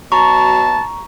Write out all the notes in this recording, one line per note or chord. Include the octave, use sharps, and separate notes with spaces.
B2 F#3 A5 A#5 C#6